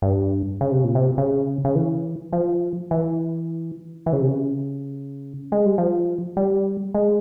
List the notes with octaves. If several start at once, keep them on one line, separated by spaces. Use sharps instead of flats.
G2
C#3
C3
A#2
C3
C#3
C#3
E3
F3
E3
E3
C#3
C3
C#3
G#3
G3
F3
G3
G#3